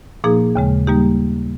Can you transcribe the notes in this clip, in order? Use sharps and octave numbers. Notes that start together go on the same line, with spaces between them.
A#2 F3 A#3 D#4 G#4
D#2 C#3 G#3
G3 A#3 D#4 G4